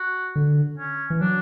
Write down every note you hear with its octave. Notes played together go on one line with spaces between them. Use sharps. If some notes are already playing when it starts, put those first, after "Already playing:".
Already playing: F#4
D3
C#4
E3
F#3 D4